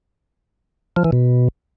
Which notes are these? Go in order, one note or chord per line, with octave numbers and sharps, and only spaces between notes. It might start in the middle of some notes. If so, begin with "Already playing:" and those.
F3
E3
B2